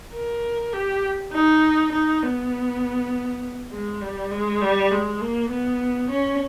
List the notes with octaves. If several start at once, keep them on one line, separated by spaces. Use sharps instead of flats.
A#4
G4
D#4
D#4
B3
G#3
G3
G#3
G3
G#3
A#3
B3
C#4